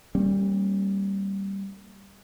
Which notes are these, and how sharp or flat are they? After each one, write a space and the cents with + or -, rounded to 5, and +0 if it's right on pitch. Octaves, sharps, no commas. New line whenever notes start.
G3 +0 A#3 -15 C#4 -40